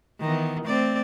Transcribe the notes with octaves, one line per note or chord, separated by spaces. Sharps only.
D#3 E3 B3
A3 C4 D5